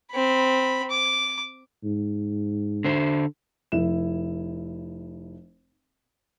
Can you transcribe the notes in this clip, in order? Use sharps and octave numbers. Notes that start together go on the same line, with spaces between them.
C4 B5
D6
G#2
D3 C5
F1 E4 E7